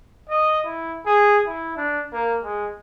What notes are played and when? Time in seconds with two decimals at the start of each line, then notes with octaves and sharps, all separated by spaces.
0.29 D#5
0.66 E4
1.06 G#4
1.47 E4
1.77 D4
2.13 A#3
2.43 G#3